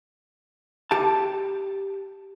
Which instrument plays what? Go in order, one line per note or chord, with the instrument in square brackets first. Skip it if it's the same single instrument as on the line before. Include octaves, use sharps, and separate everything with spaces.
[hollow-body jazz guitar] G4 A5